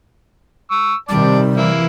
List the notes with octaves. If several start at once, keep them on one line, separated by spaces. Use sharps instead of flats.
C#6 E6
C3 D#3 G3 D5 A5 D6
E3 A#3 E4